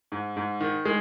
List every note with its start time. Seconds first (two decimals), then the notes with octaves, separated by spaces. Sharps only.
0.12 G#2
0.36 G#2
0.61 D#3
0.85 G#3